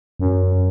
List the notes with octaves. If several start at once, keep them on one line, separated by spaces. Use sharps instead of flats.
F#2